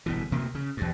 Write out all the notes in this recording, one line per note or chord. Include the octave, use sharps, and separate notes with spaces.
G1 B2 E3
D2 C3 A#3
C#3
E2 G2